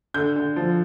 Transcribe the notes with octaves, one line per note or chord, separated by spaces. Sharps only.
D3 G6
D3
F3